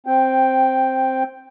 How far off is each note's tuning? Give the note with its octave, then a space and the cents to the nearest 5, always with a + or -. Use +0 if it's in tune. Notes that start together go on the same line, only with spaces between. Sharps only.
C4 +5 G5 +0